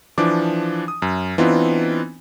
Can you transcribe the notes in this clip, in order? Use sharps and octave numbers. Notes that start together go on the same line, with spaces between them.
E3 F3 D4 D6
D#6
F#2
E3 B3 C4 D4 D#4 F4